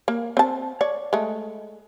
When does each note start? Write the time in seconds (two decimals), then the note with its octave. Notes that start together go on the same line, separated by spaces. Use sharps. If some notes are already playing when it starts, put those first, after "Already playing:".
0.08 A#3
0.37 C4 A5
0.81 C#5 D5
1.13 G#3 A3